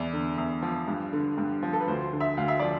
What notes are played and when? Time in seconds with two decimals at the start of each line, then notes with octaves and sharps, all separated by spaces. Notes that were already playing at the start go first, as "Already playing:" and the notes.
Already playing: E2 D5
0.13 D3
0.38 E2
0.62 F3
0.88 G2
1.13 D3
1.38 G2
1.63 F3
1.73 A4
1.80 B4
1.87 D2 C5
2.13 D3
2.20 E5
2.37 D2 F5
2.48 E5
2.60 F3 D5